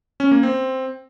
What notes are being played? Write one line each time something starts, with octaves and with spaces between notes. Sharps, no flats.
C#4
A#3
C4